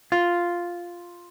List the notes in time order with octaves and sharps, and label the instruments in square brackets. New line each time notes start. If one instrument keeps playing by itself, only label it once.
[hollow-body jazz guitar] F4